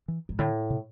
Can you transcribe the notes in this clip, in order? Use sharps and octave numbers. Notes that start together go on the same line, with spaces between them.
E3
G#2
A2 D3
C3